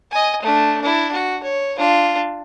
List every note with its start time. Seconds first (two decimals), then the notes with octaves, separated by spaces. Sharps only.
0.11 D#5 G#5
0.42 A3 D4
0.82 D4 E4
1.13 F#4
1.43 C#5
1.77 D4 F4